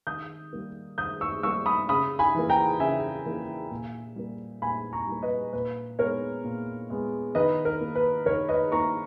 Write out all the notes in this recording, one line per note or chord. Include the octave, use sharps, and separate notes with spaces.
D#3 D#6 G6
G3 A#3
D#3 D#6 G6
C#6 E6
G3 A#3 C#6 E6
B5 D#6
C#3 B5 D#6
G#5 B5
E3 A#3
G5 A#5
C#3 E5 G#5
E3 A#3
A#2
G3 A#3
A#2 G#5 B5
A#5 C#6
G3 A#3
B4 D#5
A#2 B4
G#3 B3 A#4 C#5
A#2
G#3 B3
D#3 B4 D#5
A#4
A#3
B4
D#3 A#4 C#5
B4 D#5
A#3 A#5 C#6